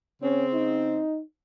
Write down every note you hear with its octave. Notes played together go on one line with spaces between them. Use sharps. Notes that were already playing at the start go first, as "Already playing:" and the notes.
C#3 C4 C#4
D#4